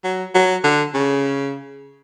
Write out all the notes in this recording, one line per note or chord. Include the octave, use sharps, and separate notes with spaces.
F#3
F#3
D3
C#3